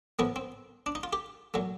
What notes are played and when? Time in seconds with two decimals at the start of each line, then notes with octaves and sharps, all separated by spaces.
0.19 A2 F3 A#3 B3
0.36 C4
0.86 D4
0.95 D#4
1.03 F4
1.13 G4
1.54 A#2 F#3 A3